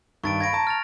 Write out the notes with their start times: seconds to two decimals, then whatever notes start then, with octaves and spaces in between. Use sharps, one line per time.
0.24 G2 D#3 C#6 A6 D7
0.40 F5 B5 G#6 A#6 D7
0.53 A5 A#5
0.67 F6 A6 F7